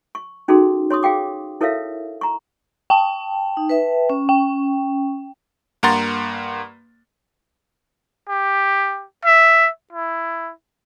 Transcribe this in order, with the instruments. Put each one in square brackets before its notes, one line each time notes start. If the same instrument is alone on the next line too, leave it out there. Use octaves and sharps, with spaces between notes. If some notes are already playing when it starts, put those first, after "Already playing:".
[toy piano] C#6
C#4 D#4 F#4 G#4 A4 C6
C#5 C6 C#6 D#6
G#4 F5 G5 D6
E4 A4 A#4 C#5 E5 F5
A#5 C#6
[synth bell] G5 A5
[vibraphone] D#4
B4 E5
C#4
[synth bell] G5
[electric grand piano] G2 A#3 F#5 A#5 C6 A6
[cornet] G4
E5
E4